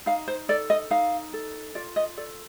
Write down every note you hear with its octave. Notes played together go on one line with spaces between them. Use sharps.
D#4 F5
C5
A4 D5
D#5
D#4 F5
A4
F4 D5
D#5
A4 D5